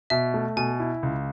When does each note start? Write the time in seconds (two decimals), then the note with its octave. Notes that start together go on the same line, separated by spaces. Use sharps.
0.10 B2 E5
0.34 A3
0.57 B2 G#5
0.80 E4
1.03 C#2